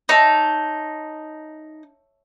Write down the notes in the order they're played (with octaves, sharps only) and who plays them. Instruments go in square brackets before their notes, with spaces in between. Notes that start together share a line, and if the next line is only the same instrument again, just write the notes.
[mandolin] D#4 [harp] C#5 E5 A5